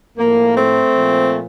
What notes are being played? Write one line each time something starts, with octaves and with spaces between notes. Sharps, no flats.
A2 F3 A#3
A3 C4
A#2 F3